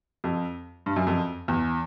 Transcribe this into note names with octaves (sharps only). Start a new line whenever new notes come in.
F2
G2
F#2
F2
E2